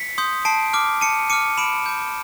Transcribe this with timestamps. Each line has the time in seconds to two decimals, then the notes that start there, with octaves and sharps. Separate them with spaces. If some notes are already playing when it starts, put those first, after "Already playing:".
Already playing: B6 C#7
0.18 C6 D#6 G6
0.45 A5 C7 D7
0.73 D6 F6
1.01 A5 C#7 D#7
1.30 D6 F6 C#7 D#7
1.57 B5 D7 E7
1.86 D6 G6